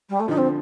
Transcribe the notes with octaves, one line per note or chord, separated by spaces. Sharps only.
G3
A3
D3 F3 D#4
C4